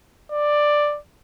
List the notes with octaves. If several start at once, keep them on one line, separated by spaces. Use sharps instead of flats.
D5